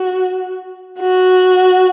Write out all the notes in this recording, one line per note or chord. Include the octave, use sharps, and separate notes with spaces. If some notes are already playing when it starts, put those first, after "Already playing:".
Already playing: F#4
F#4